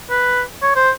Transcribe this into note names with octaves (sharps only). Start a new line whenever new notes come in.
B4
C#5
C5